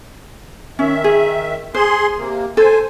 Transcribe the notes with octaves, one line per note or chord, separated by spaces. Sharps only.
D#3 C#4 E5
G#4
G#4 C5 C6
C3 A#3
A4 C5 G#5